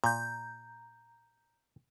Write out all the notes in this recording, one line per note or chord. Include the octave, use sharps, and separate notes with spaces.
A#2 A#5 G6